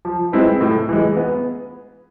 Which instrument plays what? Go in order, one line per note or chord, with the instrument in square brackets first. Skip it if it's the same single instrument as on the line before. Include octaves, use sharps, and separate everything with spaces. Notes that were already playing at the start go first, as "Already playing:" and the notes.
[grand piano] F3
G#3 C4 E4 B4
A2
E3 G#3
B3